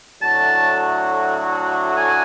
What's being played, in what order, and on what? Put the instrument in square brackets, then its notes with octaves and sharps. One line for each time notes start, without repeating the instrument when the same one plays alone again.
[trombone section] A2 F#3 A3 D4 F#4 [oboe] A5
[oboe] G#5